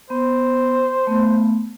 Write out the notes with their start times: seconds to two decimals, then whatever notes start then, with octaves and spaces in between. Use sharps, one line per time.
0.10 B3 C5
1.07 A3 B3